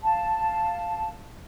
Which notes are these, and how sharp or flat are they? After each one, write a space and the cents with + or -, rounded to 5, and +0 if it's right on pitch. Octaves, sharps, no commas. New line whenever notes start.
F5 +0 A5 +0